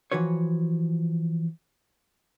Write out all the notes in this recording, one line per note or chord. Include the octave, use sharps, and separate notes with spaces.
E3 F3 F#4 B4 C#5